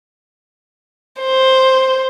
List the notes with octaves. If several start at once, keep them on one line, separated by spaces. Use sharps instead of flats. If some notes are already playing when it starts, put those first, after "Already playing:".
C5